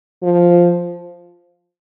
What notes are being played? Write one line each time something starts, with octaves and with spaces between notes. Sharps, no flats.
F3